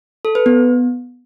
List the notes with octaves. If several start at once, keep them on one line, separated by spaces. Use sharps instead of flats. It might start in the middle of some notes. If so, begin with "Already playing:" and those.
A4
B4
B3